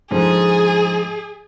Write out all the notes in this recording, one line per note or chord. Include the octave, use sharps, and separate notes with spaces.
G#2 D3 F3 G#4